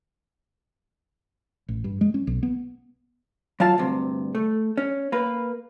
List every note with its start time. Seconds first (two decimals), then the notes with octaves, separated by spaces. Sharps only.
1.68 A1
1.84 G2
2.01 G#3
2.14 C#4
2.27 B1
2.43 B3
3.60 F#3 F4 F5 A5
3.78 D2 G2 C3
4.35 A3
4.77 C#4
5.12 A#3 B4